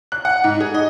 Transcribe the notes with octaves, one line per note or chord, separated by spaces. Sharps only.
F#6
F#5
G#2
G#4
D#5